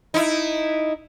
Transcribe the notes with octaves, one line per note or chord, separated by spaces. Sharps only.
D#4 E4